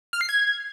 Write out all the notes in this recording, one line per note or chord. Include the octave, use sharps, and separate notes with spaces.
F6
C7
G#6